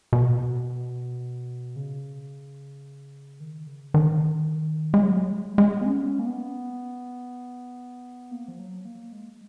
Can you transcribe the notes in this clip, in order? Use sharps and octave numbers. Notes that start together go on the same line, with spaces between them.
B2
C#3
D#3
C#3
D#3
G#3
F#3
G#3
G#3
B3
C#4
A#3
B3
A#3
F3
F#3
A#3
G#3